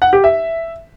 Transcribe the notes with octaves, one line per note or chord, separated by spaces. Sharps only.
F#5
G4
E5